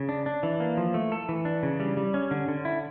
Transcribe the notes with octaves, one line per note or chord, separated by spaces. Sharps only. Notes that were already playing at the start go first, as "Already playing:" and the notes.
Already playing: C#3
D4
D4
E3
A#3
F3
A3
A4
E3
D4
C#3
G3
G3
C#4
D3
D3
E4